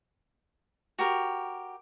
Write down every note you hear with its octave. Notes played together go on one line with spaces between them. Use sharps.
F#4 G4 A#4